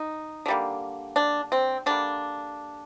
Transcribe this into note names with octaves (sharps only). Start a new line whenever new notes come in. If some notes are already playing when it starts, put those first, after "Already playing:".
Already playing: D#4
D3 G3 A#3
D4
C4
D3 G3 A#3 D4